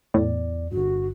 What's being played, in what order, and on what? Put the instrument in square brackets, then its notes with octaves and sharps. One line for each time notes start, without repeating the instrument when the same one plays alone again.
[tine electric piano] E2 D5 [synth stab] A2
[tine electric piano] G1 G2 [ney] F#4